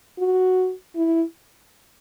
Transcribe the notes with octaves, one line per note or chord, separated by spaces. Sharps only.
F#4
E4